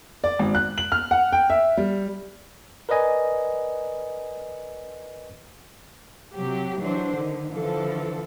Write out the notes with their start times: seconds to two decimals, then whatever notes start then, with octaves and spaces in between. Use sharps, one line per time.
0.24 D5
0.39 G#1
0.55 F#6
0.78 F#7
0.92 F6
1.11 F#5
1.32 G5
1.50 E5
1.77 G3
2.89 A#4 B4 D5 D#5 G#5
6.34 C3 F#3 G4
6.79 E3 F#3 D4 C5
7.14 D3 D#3
7.51 D3 E3 F3 A4